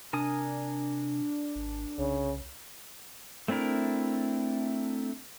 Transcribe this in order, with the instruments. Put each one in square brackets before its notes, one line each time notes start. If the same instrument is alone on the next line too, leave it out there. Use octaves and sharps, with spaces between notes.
[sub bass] C3 [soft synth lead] D4 [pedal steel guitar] A#4 G#5 D#6
[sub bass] G#1
[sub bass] C2 [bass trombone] C#3
[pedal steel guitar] A3 C4 D4 E4 A#4